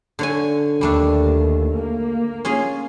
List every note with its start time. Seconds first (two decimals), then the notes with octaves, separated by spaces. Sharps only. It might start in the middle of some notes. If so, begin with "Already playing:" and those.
0.19 D3 C#5 G#5
0.81 D#2 G3 A3 D4
1.77 A#3
2.45 C#4 F4 G#4